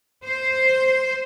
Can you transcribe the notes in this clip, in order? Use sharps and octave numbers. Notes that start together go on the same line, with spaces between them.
C5